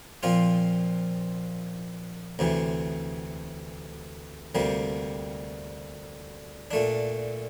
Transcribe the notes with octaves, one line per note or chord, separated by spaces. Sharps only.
A#2 F3 C4 F4
D2 C3 E3
D2 C3 G3 A#3
A#2 A3 D4